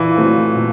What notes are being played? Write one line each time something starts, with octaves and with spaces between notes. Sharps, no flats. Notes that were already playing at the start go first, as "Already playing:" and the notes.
Already playing: A#2 E3
F#3 A3 C4
A#2